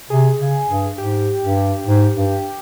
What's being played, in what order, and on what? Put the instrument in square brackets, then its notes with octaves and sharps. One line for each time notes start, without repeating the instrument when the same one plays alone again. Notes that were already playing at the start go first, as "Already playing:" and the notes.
[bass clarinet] C3 [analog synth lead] G#4
[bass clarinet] C#3
G2
[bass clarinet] G#2 [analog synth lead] G4
[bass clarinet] G2
G#2
G2